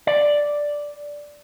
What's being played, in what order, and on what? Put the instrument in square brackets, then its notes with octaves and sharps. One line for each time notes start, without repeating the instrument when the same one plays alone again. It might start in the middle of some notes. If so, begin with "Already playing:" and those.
[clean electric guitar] D5